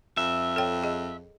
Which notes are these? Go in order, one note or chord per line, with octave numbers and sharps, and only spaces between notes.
F2 E5
A4 C#5 G5
G#4 D#5